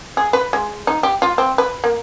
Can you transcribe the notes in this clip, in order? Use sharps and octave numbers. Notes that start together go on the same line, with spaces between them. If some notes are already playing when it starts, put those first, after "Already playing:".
G#4
B4
G#3
D#4
G4
F4
C4
B4
A#3